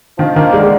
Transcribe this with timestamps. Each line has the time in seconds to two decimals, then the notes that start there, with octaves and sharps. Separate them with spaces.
0.18 D#3 F3
0.36 D#3 A#3
0.53 D3 G#3